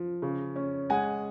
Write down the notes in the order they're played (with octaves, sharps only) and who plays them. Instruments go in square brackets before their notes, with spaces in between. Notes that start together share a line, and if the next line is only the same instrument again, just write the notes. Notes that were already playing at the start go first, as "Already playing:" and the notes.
Already playing: [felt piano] F3
C#3
C#4
G#3 F#5 G#5